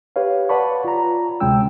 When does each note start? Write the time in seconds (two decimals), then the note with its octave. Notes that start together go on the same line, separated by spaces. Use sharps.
0.16 G4 B4 C#5 F5
0.49 B4 D5 F#5 A5 B5 C#6
0.85 F4 A#5
1.40 D2 C3 G#3 C#4 G5 E6